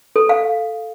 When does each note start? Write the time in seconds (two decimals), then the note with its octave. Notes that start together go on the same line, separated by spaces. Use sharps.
0.16 A4
0.29 F5